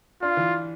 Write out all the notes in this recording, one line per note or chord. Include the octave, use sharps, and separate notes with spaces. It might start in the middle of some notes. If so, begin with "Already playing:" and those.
D4 F4
E3